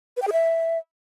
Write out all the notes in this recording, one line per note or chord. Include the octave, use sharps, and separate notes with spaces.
B4
G5
G#4
E5